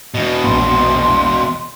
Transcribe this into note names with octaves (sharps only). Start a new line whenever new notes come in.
E2 B2
A#1 B3 C6